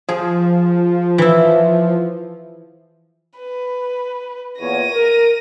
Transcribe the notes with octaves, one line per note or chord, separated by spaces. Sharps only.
F3 G#4
E3 E4
B4
E2 A#2 C#5 A#6 D#7
A#4